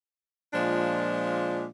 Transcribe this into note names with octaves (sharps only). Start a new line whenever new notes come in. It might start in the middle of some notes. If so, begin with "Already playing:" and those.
A#2 F3 G#3 D4